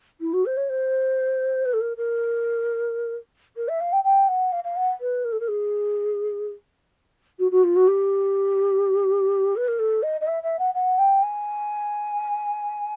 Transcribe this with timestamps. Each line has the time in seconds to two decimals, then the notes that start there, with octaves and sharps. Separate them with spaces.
0.20 E4
0.33 F#4
0.45 C5
0.57 C#5
0.69 C5
1.65 B4
1.73 A4
1.80 A#4
1.96 A#4
3.56 A#4
3.68 E5
3.80 F5
3.92 G5
4.04 G5
4.28 F#5
4.52 F5
4.64 F5
4.76 F#5
5.00 B4
5.24 A#4
5.32 A4
5.39 A#4
5.48 G#4
7.39 F#4
7.51 F#4
7.63 F4
7.76 F#4
7.87 G4
9.56 B4
9.67 A#4
9.79 A4
10.02 D#5
10.21 D#5
10.27 E5
10.42 E5
10.59 F#5
10.74 F#5
10.98 G5
11.22 G#5